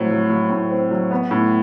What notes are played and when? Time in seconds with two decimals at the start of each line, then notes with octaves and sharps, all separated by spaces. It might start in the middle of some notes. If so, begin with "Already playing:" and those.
Already playing: A2 F#3 C4
0.10 F#3
0.29 F#3
0.50 A2
0.71 C4
0.91 F#3
1.11 B3
1.31 A2